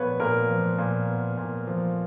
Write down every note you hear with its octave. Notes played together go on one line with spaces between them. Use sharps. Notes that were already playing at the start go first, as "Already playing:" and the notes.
Already playing: A#2 F3 B3 B4 C#5
A#2 A#4
F3
A#2
B3
A#2
F3